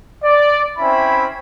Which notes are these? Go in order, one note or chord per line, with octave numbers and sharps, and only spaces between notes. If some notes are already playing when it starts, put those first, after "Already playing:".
D5
C4 C#4 E4 E5 B5